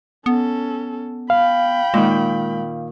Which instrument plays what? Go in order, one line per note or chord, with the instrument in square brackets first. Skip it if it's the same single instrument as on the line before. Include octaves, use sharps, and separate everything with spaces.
[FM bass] B3 [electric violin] C#4 A4
[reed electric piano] F5 [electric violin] G5 B5
[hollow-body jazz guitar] A#2 D#3 [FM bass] G#3